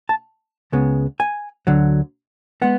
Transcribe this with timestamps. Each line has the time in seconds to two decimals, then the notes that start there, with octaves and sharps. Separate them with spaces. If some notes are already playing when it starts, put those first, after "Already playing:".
0.09 A5
0.72 C#2 C#3 G#3 B3
1.20 G#5
1.67 D2 D3 F#3
2.62 G#3 B3 F#5